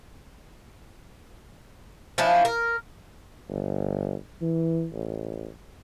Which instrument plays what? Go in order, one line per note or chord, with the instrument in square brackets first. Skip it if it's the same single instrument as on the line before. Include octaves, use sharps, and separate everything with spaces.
[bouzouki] F3 C#4 D4 E4
A#4
[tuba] G1
E3
A1